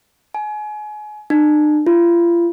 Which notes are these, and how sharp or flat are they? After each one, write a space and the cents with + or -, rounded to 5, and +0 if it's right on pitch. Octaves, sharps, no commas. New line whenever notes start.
G#5 +30
D4 +45
F4 -35